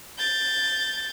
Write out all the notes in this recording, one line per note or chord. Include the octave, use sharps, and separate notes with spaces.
G6 A6